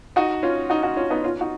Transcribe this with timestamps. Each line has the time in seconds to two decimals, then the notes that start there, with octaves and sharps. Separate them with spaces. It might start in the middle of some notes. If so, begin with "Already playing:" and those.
0.16 D#4 F#4
0.43 C#4 F4
0.70 D#4 F#4
0.83 D#4 F#4
0.97 C#4 F4
1.10 B3 D#4
1.24 C#4 F4
1.41 D#4 F#4